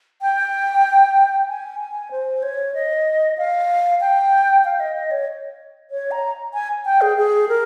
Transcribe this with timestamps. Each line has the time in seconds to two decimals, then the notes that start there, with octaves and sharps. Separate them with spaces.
0.22 G5
1.48 G#5
1.80 G#5
2.11 C5
2.43 C#5
2.74 D#5
3.38 F5
4.01 G5
4.65 F5
4.80 D#5
4.96 D#5
5.11 C#5
5.91 C#5
6.11 A#5
6.54 G#5
6.85 G5
7.01 G#4
7.17 G#4
7.49 A#4